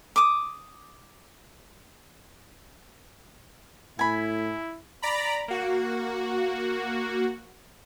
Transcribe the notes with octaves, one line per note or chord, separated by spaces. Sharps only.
D6 D#6
A2 E4 G#5 B5
D5 A#5 B5
A#3 F#4